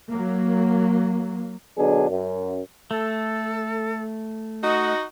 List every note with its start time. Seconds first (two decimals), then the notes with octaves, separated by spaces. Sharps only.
0.11 F#3 A#3
1.77 B1 B2 D3 F#3 D4 G#4
2.09 F#2
2.91 A3 A4
4.64 D#4 F#4 D#5